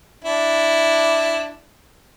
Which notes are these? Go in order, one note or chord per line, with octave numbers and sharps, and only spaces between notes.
D4 E4